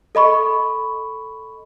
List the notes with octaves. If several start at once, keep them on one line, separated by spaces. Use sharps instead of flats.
A4 D#5 B5 C#6